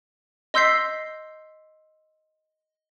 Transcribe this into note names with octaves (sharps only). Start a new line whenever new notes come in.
D#5 C6 E6 G6 B6 C7